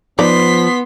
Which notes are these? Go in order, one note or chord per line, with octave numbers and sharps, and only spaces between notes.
F3 B3 D#4 D5 C6 B6